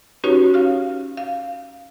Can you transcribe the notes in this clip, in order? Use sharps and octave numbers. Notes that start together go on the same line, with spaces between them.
C#4 D#4 F#4 G4 B4 C#5
F5 F6
F5